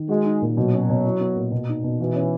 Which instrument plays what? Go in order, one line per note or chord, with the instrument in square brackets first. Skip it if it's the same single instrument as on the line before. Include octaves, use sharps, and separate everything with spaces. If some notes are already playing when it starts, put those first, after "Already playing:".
Already playing: [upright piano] D#3
[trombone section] G#3 [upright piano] F#4
[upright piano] D#4
A#2
[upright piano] B2 [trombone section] F#3
[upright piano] C#4
B2
E4
B3
A#2
B2
D#4
B2
[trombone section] E3 [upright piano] F#4
[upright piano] C#4